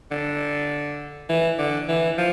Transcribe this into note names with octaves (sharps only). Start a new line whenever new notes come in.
D3
E3
D3
E3
F3